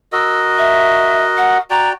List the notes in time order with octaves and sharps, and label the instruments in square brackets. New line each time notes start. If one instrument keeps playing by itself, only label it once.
[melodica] F#4 A#4 D#5 [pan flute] E6
[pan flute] E5
F#5
[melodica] F#4 D5 G5 [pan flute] A#5